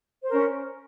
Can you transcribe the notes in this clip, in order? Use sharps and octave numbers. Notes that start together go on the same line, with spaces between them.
C#4 A#4 C5